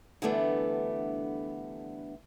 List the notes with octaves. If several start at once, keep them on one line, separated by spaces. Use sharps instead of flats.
D3 E3 G3 A3 B3 D4